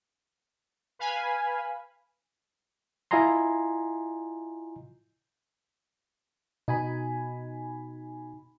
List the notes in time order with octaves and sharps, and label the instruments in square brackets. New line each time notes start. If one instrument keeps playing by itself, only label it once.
[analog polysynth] B4 F5 G#5 B5
[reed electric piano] E4 F4 D#5 G#5 A#5 C6
[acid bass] B2 [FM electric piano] D#4 G#5 B5